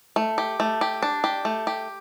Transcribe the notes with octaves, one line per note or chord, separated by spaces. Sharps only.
A3
G4
A3
G4
D4
G4
A3
G4